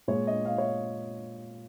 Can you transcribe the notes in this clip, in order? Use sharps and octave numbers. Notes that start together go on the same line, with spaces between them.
A#2 G#3 C#5
D#5
F5
C#5
D#5